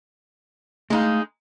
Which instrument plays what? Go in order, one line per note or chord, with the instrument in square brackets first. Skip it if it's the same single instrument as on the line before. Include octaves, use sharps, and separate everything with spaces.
[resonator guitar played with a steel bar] G#3 D#4 [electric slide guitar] A3 F5